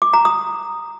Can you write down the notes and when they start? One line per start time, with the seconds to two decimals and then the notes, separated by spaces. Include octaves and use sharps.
0.02 D6
0.13 A#5
0.25 D#6